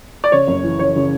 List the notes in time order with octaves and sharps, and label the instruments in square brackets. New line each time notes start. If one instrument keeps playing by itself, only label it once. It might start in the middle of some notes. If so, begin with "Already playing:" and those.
[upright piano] D5
C#3 C#5
F#1
E3
C#3 C#5
C#3